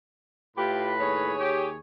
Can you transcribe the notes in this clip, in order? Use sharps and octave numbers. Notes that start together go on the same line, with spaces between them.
A2 F4 G4 B4 B5
D#2 G#4 C#5
G4